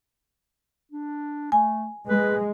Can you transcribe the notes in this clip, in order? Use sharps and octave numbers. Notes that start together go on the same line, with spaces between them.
D4
A3 G#5
G#3 B4